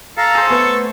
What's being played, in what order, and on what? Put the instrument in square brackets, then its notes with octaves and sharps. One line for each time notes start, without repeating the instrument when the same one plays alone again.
[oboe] A4 [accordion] F5 A#5
[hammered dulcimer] G#4 C5
[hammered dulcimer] A3 [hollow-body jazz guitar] B3 B4 [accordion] C#6